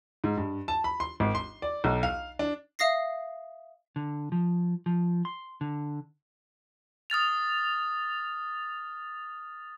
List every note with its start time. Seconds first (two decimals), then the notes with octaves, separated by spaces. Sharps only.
0.24 G#2
0.37 G2
0.68 A5
0.84 B5
1.00 C6
1.20 G#1
1.35 C6
1.62 D5
1.84 B1
2.03 F5
2.39 D4
2.79 E5 F5 D#6 A#6 C7
3.96 D3
4.32 F3
4.86 F3
5.25 C6
5.61 D3
7.10 D#6 F6 A6 F7